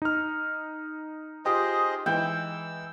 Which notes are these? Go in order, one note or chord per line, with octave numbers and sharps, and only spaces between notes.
D#4 F6
F4 G4 G#4 C5 D#5
E3 G#3 G5 E6